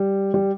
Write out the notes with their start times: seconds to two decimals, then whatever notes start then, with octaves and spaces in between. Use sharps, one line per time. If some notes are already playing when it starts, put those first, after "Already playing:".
Already playing: G3
0.34 G3